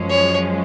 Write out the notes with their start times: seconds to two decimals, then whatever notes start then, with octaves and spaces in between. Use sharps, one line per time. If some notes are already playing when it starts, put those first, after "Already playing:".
Already playing: F#2 F3 G#3 C#4
0.09 C#5